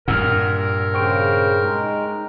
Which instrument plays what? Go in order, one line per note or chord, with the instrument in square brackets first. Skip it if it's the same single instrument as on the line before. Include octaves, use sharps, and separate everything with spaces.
[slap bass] G2 A#2 [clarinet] A#4 [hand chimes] F#5 E6 F6
[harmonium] C#3 C5 [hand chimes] G5 C#6 D7
[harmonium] G#3 D#4